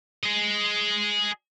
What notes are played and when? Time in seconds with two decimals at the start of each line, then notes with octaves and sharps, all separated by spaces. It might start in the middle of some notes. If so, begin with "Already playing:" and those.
0.24 G#4 D#5